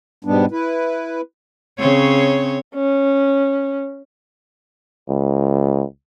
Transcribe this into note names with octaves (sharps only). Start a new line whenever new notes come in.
G#2 B2 G3 B3 D4
E4 B4
C#3 C4 C#5
C#4
C#2